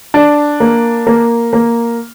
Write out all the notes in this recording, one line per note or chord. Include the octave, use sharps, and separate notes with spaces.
D4
A#3
A#3
A#3